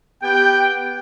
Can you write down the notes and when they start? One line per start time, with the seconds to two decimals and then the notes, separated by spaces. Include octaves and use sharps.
0.22 B3 G4 G5